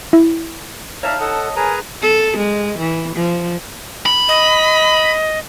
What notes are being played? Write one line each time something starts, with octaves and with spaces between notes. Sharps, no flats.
E4
D#4 C#5 D5 E5 F5 A5 A#5 F6
A4 D#5 F#5
G#4 A#4 B4 G#5 A#5
A4
G#3
E3
F3
B5
D#5